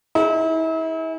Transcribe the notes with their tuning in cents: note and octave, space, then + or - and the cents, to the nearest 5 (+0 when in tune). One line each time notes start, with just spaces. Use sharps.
E4 -40 G#4 +0